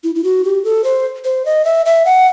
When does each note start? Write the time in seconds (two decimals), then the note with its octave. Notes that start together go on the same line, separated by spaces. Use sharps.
0.04 E4
0.15 E4
0.24 F#4
0.44 G4
0.64 A4
0.84 C5
1.24 C5
1.45 D#5
1.65 E5
1.86 E5
2.05 F#5